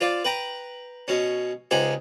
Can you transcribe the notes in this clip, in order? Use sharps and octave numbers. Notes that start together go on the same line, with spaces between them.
F4 C5 D5
B4 G5 A#5
B2 C#4
C#2 D#4 G4 C5 F#5 G#5